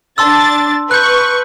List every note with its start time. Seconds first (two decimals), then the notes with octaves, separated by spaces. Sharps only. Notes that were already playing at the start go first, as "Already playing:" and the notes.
0.18 D4 A5 C6 E6 A6
0.91 B4 C#6 F#6 G6